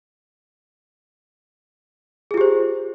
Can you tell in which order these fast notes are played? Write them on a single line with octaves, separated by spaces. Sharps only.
G#4 F4 G4 C5